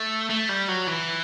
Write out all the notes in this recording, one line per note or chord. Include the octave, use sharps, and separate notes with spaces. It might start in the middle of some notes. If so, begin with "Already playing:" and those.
Already playing: A3
A3
G3
F#3
E3